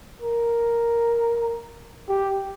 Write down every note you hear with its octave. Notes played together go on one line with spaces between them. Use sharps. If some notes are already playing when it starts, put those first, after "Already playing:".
A#4
G4